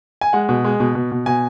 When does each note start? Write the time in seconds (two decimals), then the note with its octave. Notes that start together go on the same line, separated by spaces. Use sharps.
0.21 G#5
0.33 G#3 F#5
0.49 B2
0.64 G#3
0.80 B2
0.95 B2
1.12 B2
1.26 B2 G#5